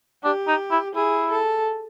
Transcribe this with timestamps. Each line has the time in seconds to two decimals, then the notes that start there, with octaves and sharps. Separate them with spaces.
0.24 D4 G4
0.47 D#4
0.71 E4
0.95 E4 G#4
1.31 A4